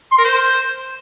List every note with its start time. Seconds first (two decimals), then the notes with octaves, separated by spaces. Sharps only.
0.12 C6
0.18 A#4
0.24 C5